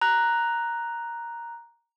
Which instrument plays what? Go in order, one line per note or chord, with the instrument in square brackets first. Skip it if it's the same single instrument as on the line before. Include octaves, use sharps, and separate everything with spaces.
[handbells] A#5 F#6